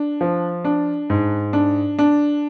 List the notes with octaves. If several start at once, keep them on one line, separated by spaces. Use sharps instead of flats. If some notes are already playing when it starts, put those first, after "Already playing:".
Already playing: D4
F3
D4
G#2
D4
D4